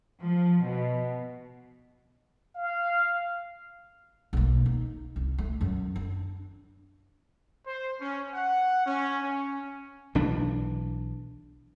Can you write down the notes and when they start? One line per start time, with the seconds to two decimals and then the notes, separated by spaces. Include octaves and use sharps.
0.21 F3
0.63 B2
2.55 F5
4.33 B1 A#3
4.66 D#4
5.16 C2
5.38 A3
5.61 F#2 F#3
5.96 D4
7.66 C5
8.00 C#4
8.33 F#5
8.86 C#4
9.22 C#4
10.15 B1 E3 D4